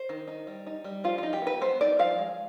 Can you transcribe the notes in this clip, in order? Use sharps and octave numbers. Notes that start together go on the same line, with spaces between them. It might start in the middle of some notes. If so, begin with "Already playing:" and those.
Already playing: C5
D#3
D#4
G3
D#4
G3
F3 F4
D#4 F4
G4
B3 B4
B3 C5
D#4 D5
F3 F5
G#3